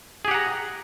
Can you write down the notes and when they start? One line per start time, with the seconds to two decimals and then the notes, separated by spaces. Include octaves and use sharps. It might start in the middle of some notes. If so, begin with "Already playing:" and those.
0.25 G#4
0.28 G4
0.31 F#5
0.34 A#5